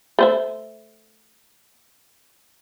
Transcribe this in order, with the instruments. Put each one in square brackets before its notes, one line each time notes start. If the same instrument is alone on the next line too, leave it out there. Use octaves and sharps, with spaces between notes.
[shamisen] A3 C5 E5